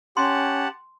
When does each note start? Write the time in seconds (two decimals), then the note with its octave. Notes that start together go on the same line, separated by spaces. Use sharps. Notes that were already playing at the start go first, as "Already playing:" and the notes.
0.17 C#4 G4 F#5 A5 C6